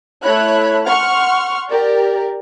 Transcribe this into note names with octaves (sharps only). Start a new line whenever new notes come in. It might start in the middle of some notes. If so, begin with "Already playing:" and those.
A3 E4 A4 C#5 B5 F#6
F#5 C6 C#6 F6
G4 A#4 D5